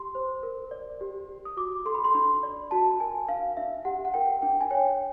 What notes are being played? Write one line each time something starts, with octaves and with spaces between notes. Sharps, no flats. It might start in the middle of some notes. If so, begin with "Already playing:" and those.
Already playing: G4 C6
C5
A#4
D5
G4
G4
D#6
F#4 D6
A4 C6
B5
C6
D4 B5
D5
F#4 A5
A#4 G#5
D4 F5
D4 E5
G4 F#5
F#5
A#4 G5
D4 G5
G#5
C#5 G5